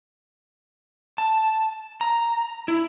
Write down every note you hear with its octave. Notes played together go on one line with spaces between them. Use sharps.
A5
A#5
E4